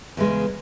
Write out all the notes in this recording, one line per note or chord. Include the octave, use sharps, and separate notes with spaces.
E2 C#3 G#3